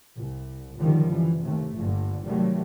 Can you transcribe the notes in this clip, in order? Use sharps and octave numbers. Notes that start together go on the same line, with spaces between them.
C2
C#2 F#2 D3 D#3 F3 G3
E3
D#2 C3 A3
G1 G2 A#2 D3
C3 D#3 F#3 G3 A3